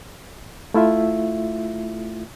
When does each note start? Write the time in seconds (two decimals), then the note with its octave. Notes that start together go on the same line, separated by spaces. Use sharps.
0.74 A3 E4 F4 E5